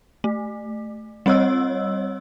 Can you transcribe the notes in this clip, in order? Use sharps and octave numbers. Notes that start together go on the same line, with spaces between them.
A3
G3 C4 C#5 D#5 E6